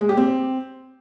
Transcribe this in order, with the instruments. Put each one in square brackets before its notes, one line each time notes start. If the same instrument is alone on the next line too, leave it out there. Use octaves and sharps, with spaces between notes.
[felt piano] G#3
G4
C4